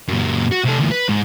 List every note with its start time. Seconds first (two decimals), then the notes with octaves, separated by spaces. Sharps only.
0.09 F#2 A#2
0.51 F#4
0.64 C3 A4
0.78 D2 E3
0.91 B4
1.09 G#2